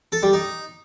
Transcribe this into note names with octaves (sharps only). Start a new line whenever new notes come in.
A4
G3
D#4